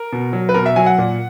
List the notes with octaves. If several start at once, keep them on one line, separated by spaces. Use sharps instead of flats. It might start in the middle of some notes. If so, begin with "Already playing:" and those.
Already playing: A#4
B2
F#3
B4
B2 A#4
E5
F#3 G#5
F#5
A#2